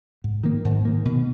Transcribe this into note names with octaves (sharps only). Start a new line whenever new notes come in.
G#2
D#3 A#3
G#2
D#3 A#3
B2